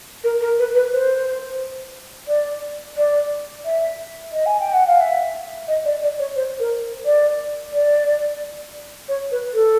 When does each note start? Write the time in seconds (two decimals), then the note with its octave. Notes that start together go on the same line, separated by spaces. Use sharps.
0.24 A#4
0.41 A#4
0.59 B4
0.75 B4
0.92 C5
2.28 D5
2.97 D5
3.65 E5
4.32 D#5
4.46 G#5
4.60 G5
4.73 F#5
4.87 F5
5.01 E5
5.68 D#5
5.85 D5
6.03 D5
6.19 C#5
6.36 C5
6.59 A#4
7.05 D5
7.73 D5
9.08 C#5
9.31 B4
9.54 A4